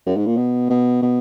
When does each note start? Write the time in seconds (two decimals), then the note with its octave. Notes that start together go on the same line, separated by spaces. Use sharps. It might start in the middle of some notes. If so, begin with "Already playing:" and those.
0.06 F#2
0.17 G#2
0.26 A#2
0.36 B2
0.70 B2
1.02 B2